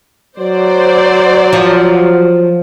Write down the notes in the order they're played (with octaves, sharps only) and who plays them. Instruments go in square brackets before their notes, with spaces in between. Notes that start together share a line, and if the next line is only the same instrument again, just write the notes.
[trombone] F#3 [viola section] C5 D5
[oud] F3